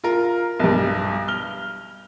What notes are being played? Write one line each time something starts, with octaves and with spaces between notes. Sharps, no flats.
F4 A#4
B1 G2
F6 G7